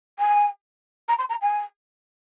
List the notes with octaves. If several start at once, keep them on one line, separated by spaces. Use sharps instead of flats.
G#5
A#5
C6
A#5
G#5